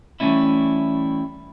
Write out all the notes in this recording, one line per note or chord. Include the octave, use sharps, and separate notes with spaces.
E3 F#3 G3 A3 C#4 E4